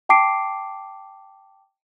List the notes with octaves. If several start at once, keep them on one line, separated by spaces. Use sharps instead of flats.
G5 A5 D6 C7 D7